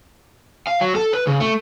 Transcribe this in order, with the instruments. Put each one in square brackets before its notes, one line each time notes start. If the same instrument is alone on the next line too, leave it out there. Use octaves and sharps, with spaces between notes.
[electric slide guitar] F5
F#3
A4
B4
C#3
A3